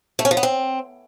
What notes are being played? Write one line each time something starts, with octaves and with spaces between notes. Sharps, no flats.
A3
C#4
F3
B3
C4